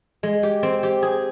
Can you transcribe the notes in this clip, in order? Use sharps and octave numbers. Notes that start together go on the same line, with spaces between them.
G#3
G4
C4
G4
G#4